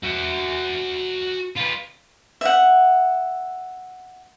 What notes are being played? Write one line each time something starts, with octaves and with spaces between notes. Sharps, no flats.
F#4 E5
F4 B4
E5 F#5